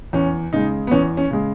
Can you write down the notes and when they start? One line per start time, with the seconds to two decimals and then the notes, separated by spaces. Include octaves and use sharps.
0.13 E2 C#4
0.52 C#3 G#3 D#4
0.87 B3
0.91 E2 C#4
1.17 C#4
1.31 C#3 G#3